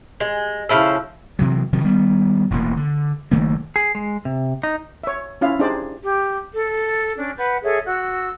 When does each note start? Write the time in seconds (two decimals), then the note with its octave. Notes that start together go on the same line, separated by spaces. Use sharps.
0.20 G#3
0.69 C#3 F3 E4 A4
1.39 C3 E3 F#3
1.73 C3 D#3 F3 F#3
1.84 D#3 G3 B3
2.50 E1 A1 B2 A#3
2.77 D3
3.31 F#1 D#3 A3 A#3
3.76 G#4
3.95 G#3
4.25 C3
4.63 D#4
5.04 C#5 E5
5.41 C#4 E4 F4 F5
5.59 D4 D#4 G4 G#4 C5 D5
6.03 G4
6.53 A4
7.16 C#4 D4
7.37 B4 F#5 G6
7.63 G#4 A4 C#5 E5
7.86 F#4 E6